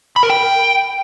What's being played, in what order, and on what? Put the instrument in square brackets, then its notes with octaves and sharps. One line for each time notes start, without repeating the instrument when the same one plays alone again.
[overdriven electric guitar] B5
A#4
G5